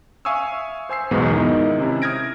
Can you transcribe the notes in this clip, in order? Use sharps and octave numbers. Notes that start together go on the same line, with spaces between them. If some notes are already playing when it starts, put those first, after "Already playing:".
E5 F5 G#5 C#6 D#6 E6
C5 G#5 E6 C7
B1 E2 G#2 B2 G#3 B3
D#3 G#3 D#4 E4
C3 C#4 E4
D#6 F6 G6 G#6 A#6 D7